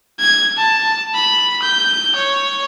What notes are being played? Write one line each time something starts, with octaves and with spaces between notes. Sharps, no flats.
G#6
A5
B5
G6
C#5